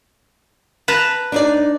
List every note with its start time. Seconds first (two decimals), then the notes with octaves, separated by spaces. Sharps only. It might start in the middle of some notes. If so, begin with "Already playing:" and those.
0.88 B4 A5 A#5
1.32 D4 D#4 D5